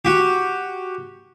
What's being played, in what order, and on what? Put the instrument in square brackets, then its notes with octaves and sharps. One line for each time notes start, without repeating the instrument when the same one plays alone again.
[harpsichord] F#4 G4